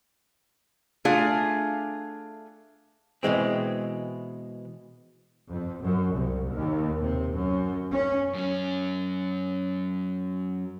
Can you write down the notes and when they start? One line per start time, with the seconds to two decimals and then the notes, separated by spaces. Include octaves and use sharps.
1.05 A3 D4 F4 G#4 F5
3.23 B2 E3 G#3 C4
5.48 F2
5.83 F#2
6.15 C2
6.51 D#2
7.01 C3
7.34 F#2
7.92 C#4
8.35 F#2 C#4